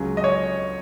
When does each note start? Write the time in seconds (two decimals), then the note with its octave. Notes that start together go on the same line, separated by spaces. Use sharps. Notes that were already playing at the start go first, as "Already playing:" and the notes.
Already playing: C#2 C#3 F#3
0.17 D#5
0.24 C#5
0.30 D#5